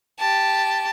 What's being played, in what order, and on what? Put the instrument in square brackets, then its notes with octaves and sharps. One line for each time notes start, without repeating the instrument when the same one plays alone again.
[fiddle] G4 A5